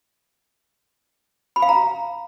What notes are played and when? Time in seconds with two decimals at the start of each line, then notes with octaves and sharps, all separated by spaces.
1.56 B5
1.62 F5
1.69 A#5